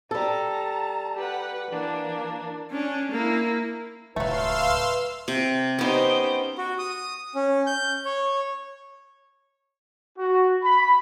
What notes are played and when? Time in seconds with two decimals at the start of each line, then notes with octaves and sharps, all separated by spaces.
0.11 G3 A4 A5 A#5
1.15 G4 B4 F#5
1.69 E3 A#3 D4
2.71 C#4 D4
3.11 A#3 E4
4.16 D1 C#2 F#3 A3 B4 F5 C6 E6
5.28 C3
5.79 B3 C#4 D#4 G4 C5
6.58 F#4
6.79 D#6
7.35 C#4
7.67 G6
8.05 C#5
10.18 F#4
10.62 B5